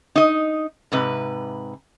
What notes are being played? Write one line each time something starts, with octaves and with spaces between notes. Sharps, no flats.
D#4 D#5
G#2 C3 B4